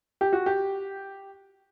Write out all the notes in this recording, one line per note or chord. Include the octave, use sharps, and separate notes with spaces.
G4
F#4
G4